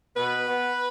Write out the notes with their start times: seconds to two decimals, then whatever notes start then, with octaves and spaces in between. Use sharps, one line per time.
0.17 B2 B4
0.47 B3